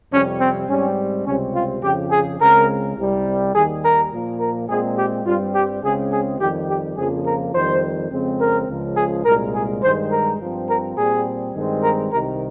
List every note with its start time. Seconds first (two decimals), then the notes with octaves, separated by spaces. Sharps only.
0.12 F2 C3 G3 C#4
0.40 C4
0.69 G#2 G3 C4 C#4
1.26 C#2 C3 G3 C4 C#4
1.54 F4
1.83 F2 C#3 F3 G4
2.11 G#4
2.40 C#2 C#3 G#3 C4 A#4
2.97 C2 C3 G3
3.54 D#2 D#3 G3 G#4
3.84 A#4
4.12 A#2 F3 A#3
4.40 A#4
4.69 A#2 G#3 C4 G#4
4.97 G4
5.26 G2 G3 C4 F4
5.55 G4
5.83 C#2 C#3 G#3 C4 G#4
6.11 G#4
6.40 F2 D#3 G3 G4
6.69 G4
6.97 F2 C#3 F3 A#3 G#4
7.26 A#4
7.54 F2 D#3 G3 C5
8.11 F2 C#3 G#3 C4
8.40 A#4
8.69 C#2 C#3 F3
8.97 G#4
9.25 C2 A#2 G#3 A#4
9.54 G#4
9.83 G2 D#3 G#3 C5
10.11 A#4
10.40 G2 F3 C4
10.68 A#4
10.97 A#2 G3 C4 G#4
11.54 G2 D#3 G#3 C4
11.83 A#4
12.11 C2 C3 D#3 A#4